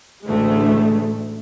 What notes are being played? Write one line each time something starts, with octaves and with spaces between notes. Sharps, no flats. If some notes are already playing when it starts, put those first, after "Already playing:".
A1 D2 G#3 A3